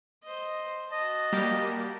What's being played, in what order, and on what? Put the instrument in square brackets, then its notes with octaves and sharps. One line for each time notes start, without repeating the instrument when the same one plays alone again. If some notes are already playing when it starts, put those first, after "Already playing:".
[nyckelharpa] C5 D#5
[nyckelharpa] F#4 A5 [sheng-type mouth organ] D#5
[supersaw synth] G3 A#3 G4